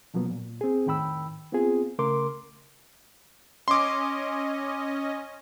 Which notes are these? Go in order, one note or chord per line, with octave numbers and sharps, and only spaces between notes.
B2 F3 F#3 A#3 B3
A#2
C4 G#4
F2 A2 D#3 G5 B5 E6
B3 C4 F4 G#4
C2 C#3 A3 A#4 C6 D6
C#4 D#5 C6 D6